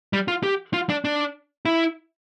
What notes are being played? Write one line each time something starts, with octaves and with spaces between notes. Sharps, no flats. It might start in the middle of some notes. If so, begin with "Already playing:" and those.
G3
F4
G4
F4
D4
D4
E4